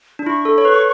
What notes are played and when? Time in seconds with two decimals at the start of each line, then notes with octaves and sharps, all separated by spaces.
0.19 D4
0.26 E4 C#6
0.45 A4
0.58 C#5
0.65 B4